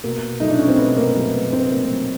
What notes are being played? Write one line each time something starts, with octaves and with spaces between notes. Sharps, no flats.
B2 A#3
F#3 A3 D#4
D4
C#4
C4
B2 B3
A#3
F#3 A3
B3
B2 C4
A#3
F#3 A3